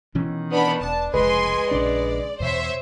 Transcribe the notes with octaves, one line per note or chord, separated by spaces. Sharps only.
B2 D#3 E3 C#4
B3 D4 B5
E1 D4 A5
F1 C#2 G#3 B4 G#5 C6
A#1 C#3 D4 D5
E2 B2 C5 C#5 E5